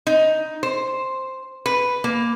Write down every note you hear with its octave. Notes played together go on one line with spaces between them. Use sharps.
D#4
C5
B4
A#3